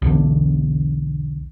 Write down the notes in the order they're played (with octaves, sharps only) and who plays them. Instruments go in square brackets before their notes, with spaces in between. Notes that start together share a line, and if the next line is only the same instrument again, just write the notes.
[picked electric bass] B1 E2 D3